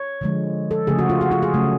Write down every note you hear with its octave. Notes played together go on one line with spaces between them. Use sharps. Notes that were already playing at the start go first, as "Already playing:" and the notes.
Already playing: C#5
D3 F3 G#3
A4
C#3 F3 A3 G#4
F#4
F4
F#4
F4
G#4
C#3 F#3 A3